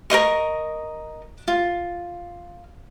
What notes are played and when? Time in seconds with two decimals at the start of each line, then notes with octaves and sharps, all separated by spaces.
0.10 A#4 C5 D#5 C#6
1.48 F4